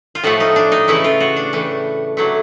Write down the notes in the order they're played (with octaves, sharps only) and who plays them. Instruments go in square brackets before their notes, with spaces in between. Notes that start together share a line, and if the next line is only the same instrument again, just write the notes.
[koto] F4
A2 F3 A3 F#4
D#4
D4
D#4
C#3 E3 A3 E4
F4
F#4
D4
A2 E3 A3
D3 F#3 A3